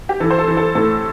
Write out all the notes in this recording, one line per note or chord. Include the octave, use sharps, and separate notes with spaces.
G4
E3 A4
C5
A4
E3
A4
A2 A4